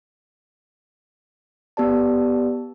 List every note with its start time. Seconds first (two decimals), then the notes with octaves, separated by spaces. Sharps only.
1.77 B3 G4 D5 A5